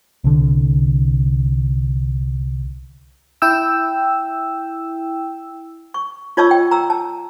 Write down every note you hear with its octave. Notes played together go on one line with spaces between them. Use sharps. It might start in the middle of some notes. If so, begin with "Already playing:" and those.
C2 D3
E4 G5 E6
C#6
F4 C#5 D#5 A5 C#6 E6
G5
A#5 E6
A5